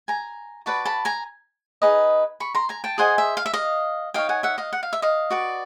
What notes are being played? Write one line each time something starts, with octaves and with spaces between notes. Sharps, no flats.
G#5 A#5
F#4 B4 D5 A5 B5
A5 B5
G#5 A#5
D#4 G#4 B4 D#5
B5 C#6
A#5 C6
G#5 A#5
G5 A5
G#4 C5 D#5 F#5 G#5
E5
F5
E5
D#5 F5
D#4 G#4 C#5 F5 G5
F#5 G#5
E5 F#5
D#5 F5
F#5
F5
E5
D#5 F5
F#4 B4 D5